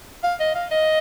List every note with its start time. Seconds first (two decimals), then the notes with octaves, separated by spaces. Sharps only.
0.23 F5
0.40 D#5
0.55 F5
0.71 D#5